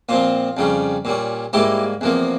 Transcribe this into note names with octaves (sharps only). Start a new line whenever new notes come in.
A#2 F3 C4 F4
F2 C#3 G3 C#4
A#2 G3 C#4
G#2 G3 A#3 E4 G4
E2 C3 F3 A#3